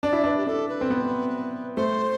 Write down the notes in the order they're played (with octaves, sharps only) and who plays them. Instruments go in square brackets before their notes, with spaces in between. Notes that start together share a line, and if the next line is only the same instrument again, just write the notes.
[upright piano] D4 [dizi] D5
[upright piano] E4
[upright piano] D4 [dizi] B4
[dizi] G4
[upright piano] D4 [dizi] A4
[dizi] B4
[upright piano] C4
B3
[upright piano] A3 [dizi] C5